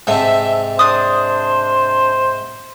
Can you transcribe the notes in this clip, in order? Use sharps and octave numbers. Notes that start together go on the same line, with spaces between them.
G#2 C3 C4 A4 E5
D4 C5 D#6